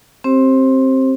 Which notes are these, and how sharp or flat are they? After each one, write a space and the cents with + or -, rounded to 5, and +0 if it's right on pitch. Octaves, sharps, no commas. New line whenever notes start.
C4 +15 G4 -10 C5 +20